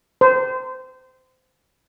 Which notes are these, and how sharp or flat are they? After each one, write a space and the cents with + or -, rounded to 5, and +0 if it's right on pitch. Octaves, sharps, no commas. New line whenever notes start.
C5 -25